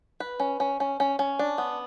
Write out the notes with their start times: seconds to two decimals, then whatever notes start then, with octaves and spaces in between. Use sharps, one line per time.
0.20 B4
0.40 C#4
0.60 C#4
0.80 C#4
1.00 C#4
1.19 C#4
1.39 D4
1.58 B3